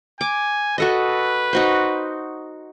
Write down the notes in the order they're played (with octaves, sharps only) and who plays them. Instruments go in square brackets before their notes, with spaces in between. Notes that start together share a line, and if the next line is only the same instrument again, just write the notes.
[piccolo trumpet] G#5 [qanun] D6
[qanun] F#4 A4 D#5 [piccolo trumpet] B4
[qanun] D#4 F#4 C5